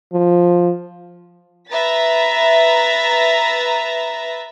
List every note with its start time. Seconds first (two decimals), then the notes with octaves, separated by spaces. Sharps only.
0.13 F3
1.70 B4 E5 A#5 A6 B6